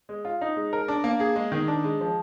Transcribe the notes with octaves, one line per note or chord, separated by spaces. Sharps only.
G#3
F4
D#4
G#3
A#4
D4
A#3
G#4
G#3
D#3
D4
G#3
F3